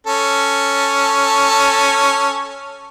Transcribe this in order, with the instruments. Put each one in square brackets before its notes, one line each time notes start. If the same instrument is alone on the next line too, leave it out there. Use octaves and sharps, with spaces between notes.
[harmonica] C#4 A4